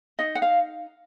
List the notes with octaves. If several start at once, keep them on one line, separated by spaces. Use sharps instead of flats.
D#4 D#5
F#5
F5